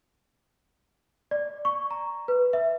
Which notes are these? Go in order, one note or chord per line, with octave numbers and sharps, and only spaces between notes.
D5
C#6
A#5
B4
E5